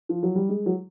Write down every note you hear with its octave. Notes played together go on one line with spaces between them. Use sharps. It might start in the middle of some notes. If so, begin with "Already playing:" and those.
F3
F#3
G3
G#3
F#3